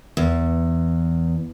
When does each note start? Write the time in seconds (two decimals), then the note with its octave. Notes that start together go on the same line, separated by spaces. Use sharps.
0.17 E2